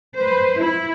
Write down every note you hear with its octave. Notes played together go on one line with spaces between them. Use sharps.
B4 C5
E4